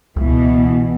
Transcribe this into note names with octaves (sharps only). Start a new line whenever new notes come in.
C#2 B2 E3